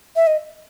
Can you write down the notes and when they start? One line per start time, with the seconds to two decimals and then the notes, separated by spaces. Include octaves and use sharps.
0.16 E5
0.27 D#5